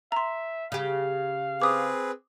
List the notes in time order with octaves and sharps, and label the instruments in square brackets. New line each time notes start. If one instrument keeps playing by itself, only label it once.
[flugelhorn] E5 [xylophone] A#5 C6
[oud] C#3 G4 [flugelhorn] F5
[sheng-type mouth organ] C4 G#4 B4 [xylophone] D6 D#6